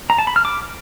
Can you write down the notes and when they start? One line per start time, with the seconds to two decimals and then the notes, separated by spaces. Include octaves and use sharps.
0.10 A#5
0.18 A5
0.27 B5
0.36 F6
0.45 D6